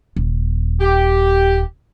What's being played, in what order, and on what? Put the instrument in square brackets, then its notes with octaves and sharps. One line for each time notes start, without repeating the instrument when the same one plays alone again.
[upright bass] D#1
[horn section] G4